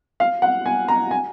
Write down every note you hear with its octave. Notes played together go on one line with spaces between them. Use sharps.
F5
F#5
G#5
A#5
G#5